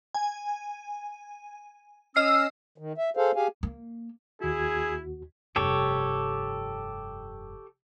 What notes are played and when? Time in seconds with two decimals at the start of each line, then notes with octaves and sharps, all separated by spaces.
0.14 G#5
2.16 C#4 D#5 E6 F6 C7
2.78 D#3
2.98 E5
3.17 G#4 A4 C5 F5
3.36 G4 G#4 F5 G#5
3.63 A#3
4.41 D#2 E4 F#4 G#4
5.56 F1 G2 G4 A4 C#5